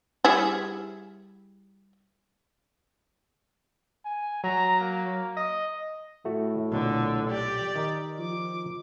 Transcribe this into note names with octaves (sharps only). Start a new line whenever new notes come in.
G3 E4 G#4
G#5
F#3 A#5
A#3
D#5
A2 A3 F#4
B1 A#2 D3
G4 D5
D#3 A#4
F3 D6